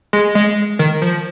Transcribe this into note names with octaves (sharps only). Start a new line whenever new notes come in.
G#3
G#3
D#3
F3